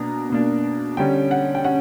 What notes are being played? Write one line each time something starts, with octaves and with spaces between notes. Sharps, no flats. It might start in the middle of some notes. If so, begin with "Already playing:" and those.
Already playing: B2 A#3 D4 A#5
B2 A#3 D4
D3 G3 C#4 G5
F#5
G5
C#4 F#5